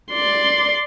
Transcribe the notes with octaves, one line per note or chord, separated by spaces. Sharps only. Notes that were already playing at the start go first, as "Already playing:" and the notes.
D5 C6